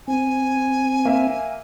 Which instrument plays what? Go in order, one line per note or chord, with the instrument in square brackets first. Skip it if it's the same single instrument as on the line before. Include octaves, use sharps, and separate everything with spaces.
[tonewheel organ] C4 [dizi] G#5
[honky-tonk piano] A#3 E5